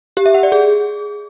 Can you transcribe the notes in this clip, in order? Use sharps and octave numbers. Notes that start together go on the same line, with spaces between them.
G4
E5
F#5
D5
G#4